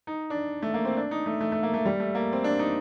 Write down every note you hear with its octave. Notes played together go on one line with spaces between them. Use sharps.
D#4
D4
A3
A#3
C4
D4
D#4
A3
A3
A3
A#3
A3
G3
A3
A#3
C4
D4
D#4